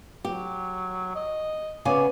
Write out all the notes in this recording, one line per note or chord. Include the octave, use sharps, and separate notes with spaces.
F#3 G4
D#5
C#3 B3 D5 G#5